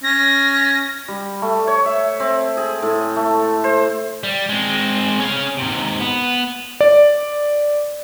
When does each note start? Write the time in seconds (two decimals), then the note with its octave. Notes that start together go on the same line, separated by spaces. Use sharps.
0.03 C#4 A#6
1.08 G3
1.42 A3
1.67 C#5
1.86 E5
2.20 C4
2.57 G#4
2.82 A2
3.16 A3
3.64 C5
4.24 G3
4.49 G#3 C4
5.20 C#4 F5
5.58 G#2 C3
6.00 B3
6.81 D5